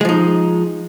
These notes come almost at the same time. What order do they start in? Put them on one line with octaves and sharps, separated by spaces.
G#3 F3 D#4